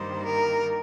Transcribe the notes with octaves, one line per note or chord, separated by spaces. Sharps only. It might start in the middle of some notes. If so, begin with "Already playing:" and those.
Already playing: G2 D#3 G3 A#3 C5
A#4